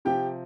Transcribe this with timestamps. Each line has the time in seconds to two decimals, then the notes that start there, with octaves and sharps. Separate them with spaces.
0.05 C3 F3 G4 G5